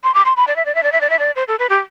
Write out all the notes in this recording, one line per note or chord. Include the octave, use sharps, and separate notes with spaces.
C6
D6
C6
B5
D5
E5
D5
E5
D5
E5
D5
E5
D5
C5
A4
B4
G4